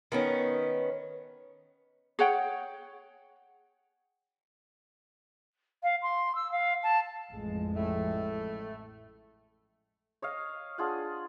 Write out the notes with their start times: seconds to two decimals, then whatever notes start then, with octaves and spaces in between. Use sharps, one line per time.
0.12 D#3 B3 C#4
2.19 G#4 C#5 F#5 G5
5.83 F5
6.02 C6
6.35 E6
6.51 F5
6.83 A5
7.32 A1 F2 G#3
7.76 A2 A3
10.22 C#5 D#5 F5
10.78 D4 F4 G#4 F#5